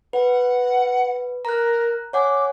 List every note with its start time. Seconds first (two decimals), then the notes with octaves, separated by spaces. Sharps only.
0.13 B4 F#5
1.45 A#4 A#5 F#6
2.13 C#5 F#5 G#5 D6